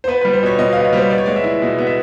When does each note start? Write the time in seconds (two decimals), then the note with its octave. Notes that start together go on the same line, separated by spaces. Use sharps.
0.04 C5
0.08 B3 B4
0.21 G3 B4
0.33 C5
0.43 B2 C#5
0.59 B2 D#5
0.73 B3 F5
0.85 C#5
0.93 G3 C5
1.10 B3 D5
1.18 C#5
1.26 G#3 D5
1.36 E5
1.44 E4
1.62 B2
1.79 B3
1.87 E5